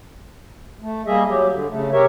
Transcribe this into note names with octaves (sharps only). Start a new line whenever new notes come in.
A3
G3 A#3 G#4 D#5 E5
F#3 G4
D3
C#3 A3
C3 G4 A#4 C#5 E5